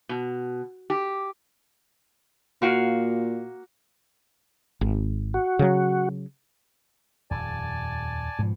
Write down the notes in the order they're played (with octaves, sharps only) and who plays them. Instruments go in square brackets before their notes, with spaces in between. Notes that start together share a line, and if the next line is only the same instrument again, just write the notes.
[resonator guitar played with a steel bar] B2
G4
[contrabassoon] A#2 [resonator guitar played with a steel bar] A#3 F#4 F5
[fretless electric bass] G#1
[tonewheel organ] F#4
[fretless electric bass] C#3 F#3
[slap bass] D#1 F2 [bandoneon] D5 G#5 A5
[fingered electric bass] G#2 F3 [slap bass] B2